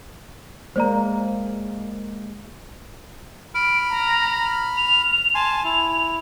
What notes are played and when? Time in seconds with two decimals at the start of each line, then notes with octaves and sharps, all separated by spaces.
0.76 G#3 A#3 C5 D5 A#5
3.55 B5 F6 D7
3.90 A#5
4.77 F7
5.35 G#5 A5 C6
5.64 E4 F7